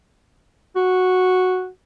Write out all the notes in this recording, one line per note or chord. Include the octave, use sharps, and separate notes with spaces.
F#4